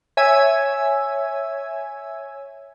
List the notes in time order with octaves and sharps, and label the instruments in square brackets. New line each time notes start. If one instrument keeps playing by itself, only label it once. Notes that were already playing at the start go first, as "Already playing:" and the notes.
[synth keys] C#5 E5 G#5 E6 G#6